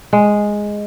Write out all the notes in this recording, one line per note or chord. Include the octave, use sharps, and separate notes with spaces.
G#3